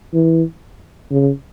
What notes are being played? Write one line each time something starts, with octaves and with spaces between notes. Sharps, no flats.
E3
C#3